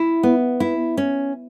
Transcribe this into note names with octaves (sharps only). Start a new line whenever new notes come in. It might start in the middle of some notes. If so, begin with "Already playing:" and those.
Already playing: E4
B3
E4
C#4